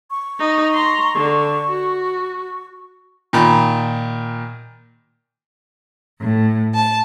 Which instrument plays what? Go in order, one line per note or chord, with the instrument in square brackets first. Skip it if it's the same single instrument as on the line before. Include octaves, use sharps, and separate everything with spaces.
[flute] C#6
[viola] D#4
A#5 C6
D3
F#4
[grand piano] A#2 D#3 B5
[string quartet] A2
A5